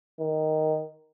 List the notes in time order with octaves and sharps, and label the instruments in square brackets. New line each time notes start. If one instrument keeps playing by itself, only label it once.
[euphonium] D#3